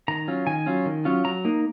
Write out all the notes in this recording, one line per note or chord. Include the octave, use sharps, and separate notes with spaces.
D#3 A#5
F#3 C#4 F4
D#3 G#5
F#3 C#4 F4
D#3
F#3 C#4 F4
F#3 A#5
A#3 D#4